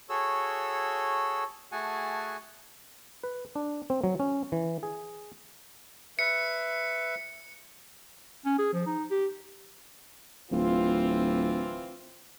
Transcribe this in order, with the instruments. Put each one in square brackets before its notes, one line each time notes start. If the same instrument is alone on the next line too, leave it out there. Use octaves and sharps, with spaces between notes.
[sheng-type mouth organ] F#4 G#4 A4 C#5 E6
A3 F#4 G#4 F#5 G#5 A5
[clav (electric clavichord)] B4
D4
C4
F#3
C#4
E3
G#4
[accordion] B4 E5 [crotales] C#7
[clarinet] C#4
G#4
F3
D#4
G4
[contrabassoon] D1 [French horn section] E3 C4 F4